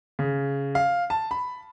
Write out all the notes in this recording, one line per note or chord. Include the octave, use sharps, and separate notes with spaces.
C#3
F5
A5
B5